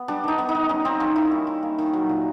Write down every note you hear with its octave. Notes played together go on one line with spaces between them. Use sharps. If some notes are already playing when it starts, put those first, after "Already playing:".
Already playing: B3
G3 D4
D#3 D#4
B3
D#4
D#3
G3 C#4
D#3 C4
A#3 C#4
D#3 E4
G3
D#3
A#3
D#3
F#3
A#2